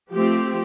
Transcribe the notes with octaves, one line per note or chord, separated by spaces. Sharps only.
F3 A3 C4 G4